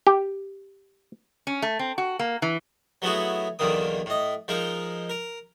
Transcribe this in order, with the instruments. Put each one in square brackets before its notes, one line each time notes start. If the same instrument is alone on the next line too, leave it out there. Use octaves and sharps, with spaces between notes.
[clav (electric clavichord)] G4
[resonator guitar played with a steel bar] C#4
A3
C4
F#4
A#3
E3
[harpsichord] F#3 A3 B3 E4 F#4 G#4
B1 E2 D3 D#3 A#3 D#6
A2 D#5
F3 G#3 D#4 A#4
A#4